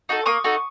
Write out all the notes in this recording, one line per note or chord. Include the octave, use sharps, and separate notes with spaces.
D#4 F#4 A4
A#3 C#6 D#6
D#4 F#4 A4